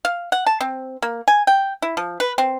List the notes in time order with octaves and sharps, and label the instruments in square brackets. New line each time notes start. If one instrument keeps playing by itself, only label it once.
[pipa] F5
F#5
A5
C4
A#3
G#5
G5
E4
F3
B4
C4